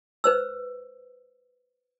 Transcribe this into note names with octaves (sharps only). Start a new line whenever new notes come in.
B4 C5 E6